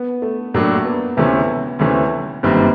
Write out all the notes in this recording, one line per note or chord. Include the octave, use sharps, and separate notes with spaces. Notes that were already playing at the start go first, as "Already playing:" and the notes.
Already playing: B3
A3
A2 F#3 A3 A#3 D4
B3
D2 C3 E3 A3 B3 C#4
D2 C3 E3 A3 C#4
G1 F#2 D#3 G3 A#3 C4